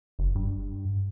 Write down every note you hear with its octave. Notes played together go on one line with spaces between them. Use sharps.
F#1
G2